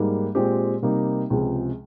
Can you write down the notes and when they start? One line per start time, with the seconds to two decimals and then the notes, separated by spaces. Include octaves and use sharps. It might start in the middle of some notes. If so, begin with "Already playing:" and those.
Already playing: G#2 G3 A#3
0.35 A#2 G#3 C4 G4
0.82 C3 G3 A#3 D#4 G4
1.30 C#2 C3 F3 G#3